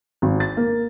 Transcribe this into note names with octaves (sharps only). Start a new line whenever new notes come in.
G#1
A6
A#3